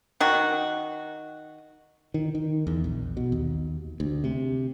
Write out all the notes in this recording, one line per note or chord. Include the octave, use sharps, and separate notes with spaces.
D#3 F#4
D#3
D#3
E2
A#1
B2
D#2
D2
C3